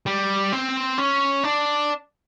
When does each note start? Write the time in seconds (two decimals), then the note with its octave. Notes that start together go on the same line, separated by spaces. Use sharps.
0.06 G3
0.52 C4
0.98 C#4
1.44 D4